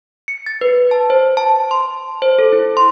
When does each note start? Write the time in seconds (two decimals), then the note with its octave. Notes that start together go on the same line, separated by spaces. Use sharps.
0.28 C#7
0.46 A6
0.61 B4
0.91 A5
1.10 C5
1.37 A5
1.71 C6
2.22 C5
2.39 A4
2.52 E4
2.77 C6